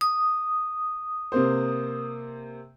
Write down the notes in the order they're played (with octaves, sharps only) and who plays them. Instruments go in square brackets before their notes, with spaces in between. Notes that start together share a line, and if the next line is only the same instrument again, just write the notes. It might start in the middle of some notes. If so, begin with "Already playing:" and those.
[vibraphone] D#6
[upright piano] C3 A#3 C5